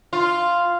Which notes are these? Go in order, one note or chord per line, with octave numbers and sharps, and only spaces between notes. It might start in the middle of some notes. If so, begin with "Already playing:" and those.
F4